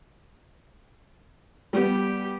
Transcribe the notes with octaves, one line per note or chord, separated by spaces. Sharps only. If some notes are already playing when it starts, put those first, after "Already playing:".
G3 B3 G4